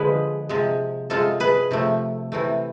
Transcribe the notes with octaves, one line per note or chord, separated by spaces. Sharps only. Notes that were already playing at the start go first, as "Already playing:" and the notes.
Already playing: D3 F3 G#3 G#4 B4
C3 F3 G#3
C3 G#3 F4 A4
G#4 B4
C3 F3 A3
C3 E3 A3